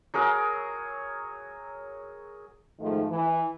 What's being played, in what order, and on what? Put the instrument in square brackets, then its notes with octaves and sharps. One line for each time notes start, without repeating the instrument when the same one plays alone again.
[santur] F#3 G#4 A#4
[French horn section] G#2 D#3 F3 A3
E3